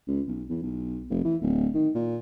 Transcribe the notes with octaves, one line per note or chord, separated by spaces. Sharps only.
C#2
B1
E2
B1
F1
E3
D1
D#3
A#2